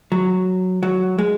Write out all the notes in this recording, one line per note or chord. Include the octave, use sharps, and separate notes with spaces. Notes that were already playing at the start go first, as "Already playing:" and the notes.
F#3
F#3
G#3